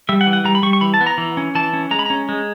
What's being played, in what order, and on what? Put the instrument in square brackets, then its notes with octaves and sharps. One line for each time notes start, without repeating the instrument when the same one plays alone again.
[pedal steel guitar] G3 E5
F#5
E3
F#5
G3 A#5
B5
G3 C#6
C#6
E3 B5
A5
B3
A#5
E3
C#4
E3 A5
C#4
G#3 A#5
B5
C#4 A#5
G#3